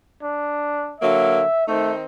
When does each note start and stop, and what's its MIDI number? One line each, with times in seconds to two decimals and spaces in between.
0.22 0.95 62
1.01 1.41 50
1.01 1.41 54
1.01 1.41 58
1.01 1.64 76
1.67 2.06 51
1.67 1.91 57
1.67 2.06 60
1.67 2.06 63